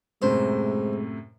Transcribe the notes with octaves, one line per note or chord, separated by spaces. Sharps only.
F#2 A2 C3 G#3 C5